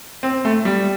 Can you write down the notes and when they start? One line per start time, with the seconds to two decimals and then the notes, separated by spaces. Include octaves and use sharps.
0.23 C4
0.45 A3
0.65 G3